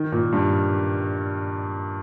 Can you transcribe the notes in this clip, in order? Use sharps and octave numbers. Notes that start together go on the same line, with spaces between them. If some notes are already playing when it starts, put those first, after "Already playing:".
Already playing: D#3
A#2
G2